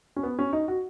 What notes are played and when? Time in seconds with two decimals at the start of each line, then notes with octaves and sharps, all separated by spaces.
0.16 C#4
0.23 B3
0.39 C#4
0.53 D#4
0.68 F#4